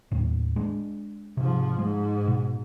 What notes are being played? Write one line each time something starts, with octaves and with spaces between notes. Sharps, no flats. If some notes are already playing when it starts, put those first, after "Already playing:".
D#2 A2
G#3 D4
G#2 C3 F3
G#2 G#3
B2